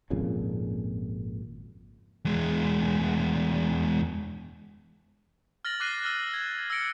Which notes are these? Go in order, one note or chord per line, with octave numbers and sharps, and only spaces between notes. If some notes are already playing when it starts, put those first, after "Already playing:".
G#1 F2 A#2 C#3
E2 G#3
F6 A6 A#6 F#7
D6 F6 F#6 A#6 C7 D#7
E6 F6 A6 G7
G#6
E6 F6 A6 A#6 C#7 D7